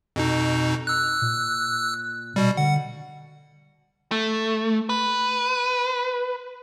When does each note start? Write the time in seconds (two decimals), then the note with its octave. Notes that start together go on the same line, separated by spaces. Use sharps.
0.16 F2 B2 D#4
0.87 E6 F#6
1.22 A#2
2.36 B2 G3
2.57 D3 F#5
4.12 A3
4.89 B4